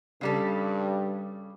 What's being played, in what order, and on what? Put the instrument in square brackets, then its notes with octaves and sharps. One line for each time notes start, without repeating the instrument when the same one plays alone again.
[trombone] G2 [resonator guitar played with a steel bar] C#3 G3 A4